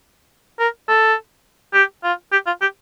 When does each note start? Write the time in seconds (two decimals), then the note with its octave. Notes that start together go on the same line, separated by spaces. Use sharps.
0.60 A#4
0.88 A4
1.74 G4
2.04 F4
2.32 G4
2.47 F4
2.62 G4